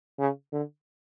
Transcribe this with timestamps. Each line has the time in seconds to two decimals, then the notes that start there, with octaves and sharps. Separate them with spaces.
0.19 C#3
0.52 D3